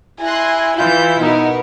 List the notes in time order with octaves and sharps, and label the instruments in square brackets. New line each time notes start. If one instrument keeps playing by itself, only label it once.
[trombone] E4 [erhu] G#5 [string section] C6 F#6 A#6
[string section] E3 G6 [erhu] E4 [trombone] F4
[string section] B2 B3 A#4 [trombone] D#4